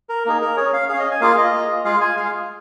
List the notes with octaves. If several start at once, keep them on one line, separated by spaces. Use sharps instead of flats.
A#4
A#3 D#4 G#4
A#4
C#4 G#4 C#5
F5
C#4 G#4 F5
D#5
G#5
A#3 F4 G#4 F5
D#5
A#3 F4 G#4
G#3 F4 G#4 F5
G#5
G#3 F4 G#4 F5